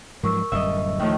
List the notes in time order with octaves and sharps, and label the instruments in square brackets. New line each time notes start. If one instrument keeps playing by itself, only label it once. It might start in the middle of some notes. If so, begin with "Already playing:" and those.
[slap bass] G#2 F3 F#3 [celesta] A#4 C#6 E6
[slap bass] D1 F#2 G3 [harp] D#5 E5
[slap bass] D2 F3 [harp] A2 D#3